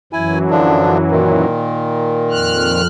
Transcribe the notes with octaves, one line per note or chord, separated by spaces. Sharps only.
F#2 E3 F#3 E4 G#5
D3 F3 D4
A#2 D#3
F2 F6 F#6